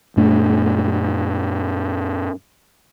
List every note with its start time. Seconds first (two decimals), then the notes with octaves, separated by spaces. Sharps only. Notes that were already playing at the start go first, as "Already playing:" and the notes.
0.17 F#2 A#2 A3 D4